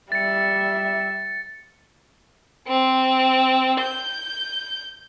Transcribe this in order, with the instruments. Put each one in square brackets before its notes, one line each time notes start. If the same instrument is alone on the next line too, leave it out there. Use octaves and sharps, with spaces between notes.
[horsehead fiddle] G3 E5 [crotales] A6 C#7
[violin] C4
G6